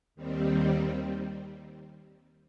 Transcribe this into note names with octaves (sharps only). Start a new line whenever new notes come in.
D#2 D#3 G3 C4